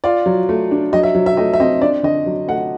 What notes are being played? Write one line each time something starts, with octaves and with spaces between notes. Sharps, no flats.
F4 D5
F#3
A3
D4
F#3 D#5
E5
F#3
E5
A3 D#5
E5
C4 D#5
D4 D5
D3 D#5
F#3
A3 F#5